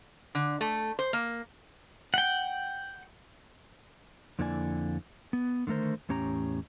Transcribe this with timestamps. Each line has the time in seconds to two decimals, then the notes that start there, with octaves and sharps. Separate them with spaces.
0.35 D3
0.61 A3
0.99 C5
1.13 A#3
2.14 F#5 G5
4.39 F2 D3 A#3 E4 D5 G#5
5.33 B3
5.67 D3 D#3 A3 A#4 C5
6.09 E2 A2 C#4 G4 A#5